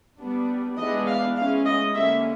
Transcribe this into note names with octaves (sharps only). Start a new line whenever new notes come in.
G3 B3 D4
E3 G#3 B3 D4 D#5
F5
E3 G#3 C#4 F5
D#5
D3 G3 A#3 C#4 E5